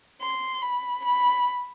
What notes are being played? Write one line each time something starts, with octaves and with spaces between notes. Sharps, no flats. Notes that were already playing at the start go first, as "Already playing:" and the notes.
C6
B5
B5